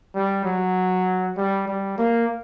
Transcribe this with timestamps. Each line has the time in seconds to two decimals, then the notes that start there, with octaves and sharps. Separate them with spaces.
0.15 G3
0.45 F#3
1.37 G3
1.67 G3
1.98 A#3